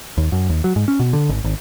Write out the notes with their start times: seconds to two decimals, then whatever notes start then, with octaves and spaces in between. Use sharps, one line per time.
0.17 D#2
0.32 F#2
0.49 D#2
0.64 F#3
0.76 G#2
0.88 C#4
1.00 B2
1.13 D3
1.29 G#1
1.44 G#1